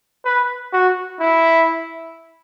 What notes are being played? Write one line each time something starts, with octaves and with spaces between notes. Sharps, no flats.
B4
F#4
E4